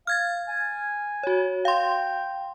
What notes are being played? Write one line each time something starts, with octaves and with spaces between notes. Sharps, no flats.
F5 F6 G#6 A6
G#5
F#4 C#5
F5 G5 C6